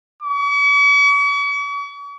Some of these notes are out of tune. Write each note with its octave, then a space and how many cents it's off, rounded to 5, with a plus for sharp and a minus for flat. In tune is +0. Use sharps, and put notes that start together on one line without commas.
C#6 +45